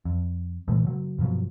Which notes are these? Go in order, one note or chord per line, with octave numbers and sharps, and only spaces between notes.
F2
A#2 E3 G#3 A3
C#3 F#3
G2 B2 F3 F#3